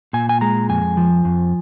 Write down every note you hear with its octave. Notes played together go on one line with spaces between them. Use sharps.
A#2 G#5
G#5
G#3 A#5
F2 G#5
F3
F2